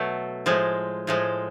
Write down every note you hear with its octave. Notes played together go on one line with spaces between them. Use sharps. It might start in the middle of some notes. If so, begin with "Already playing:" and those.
Already playing: B2 F#3 A3
A2 F3 G#3
A2 F3 G#3